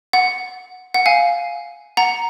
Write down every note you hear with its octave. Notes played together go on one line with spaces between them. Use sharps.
F#5
F#5
F5 G#5
F#5 A#5